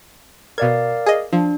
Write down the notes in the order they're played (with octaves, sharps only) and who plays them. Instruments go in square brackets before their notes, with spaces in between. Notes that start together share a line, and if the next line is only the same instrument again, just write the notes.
[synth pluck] B2 G#6 [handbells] A#4 D5 F5
[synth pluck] G#4 D#5
[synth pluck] F3 [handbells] D4